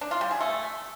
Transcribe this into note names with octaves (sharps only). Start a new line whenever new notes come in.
D4
F4
G3
G#4
A3